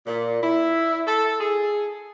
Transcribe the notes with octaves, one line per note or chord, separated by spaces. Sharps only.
A#2
E4
A4
G#4